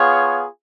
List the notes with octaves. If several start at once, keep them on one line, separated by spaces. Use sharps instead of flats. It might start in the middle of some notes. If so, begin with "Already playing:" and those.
Already playing: B3 F4 G#4 C#5 F5